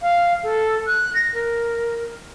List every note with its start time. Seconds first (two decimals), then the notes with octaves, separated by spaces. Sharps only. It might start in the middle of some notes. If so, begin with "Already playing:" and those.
0.02 F5
0.44 A4
0.88 F#6
1.15 A#6
1.34 A#4